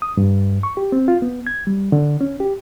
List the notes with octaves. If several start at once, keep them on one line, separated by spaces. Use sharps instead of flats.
D#6
G2
C#6
G4
C4
F4
B3
G#6
G3
D3
C#4
G4